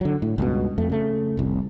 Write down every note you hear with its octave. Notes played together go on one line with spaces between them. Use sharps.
D3 F#3
A2
C#2 G2 B2
F2 A3
C#3 A3
F1 C2